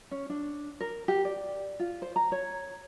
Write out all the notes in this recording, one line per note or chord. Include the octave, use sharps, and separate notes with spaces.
C#4
D4
A#4
G4
D5
F4
C5
A#5
C#5